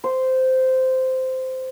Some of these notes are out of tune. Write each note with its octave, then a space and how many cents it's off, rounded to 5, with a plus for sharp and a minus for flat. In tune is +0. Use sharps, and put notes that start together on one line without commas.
C5 -10